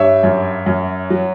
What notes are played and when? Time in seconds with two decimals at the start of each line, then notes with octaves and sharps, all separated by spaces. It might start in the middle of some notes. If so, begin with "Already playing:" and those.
Already playing: G2 C#5 E5
0.23 F#2
0.66 F#2
1.10 F#3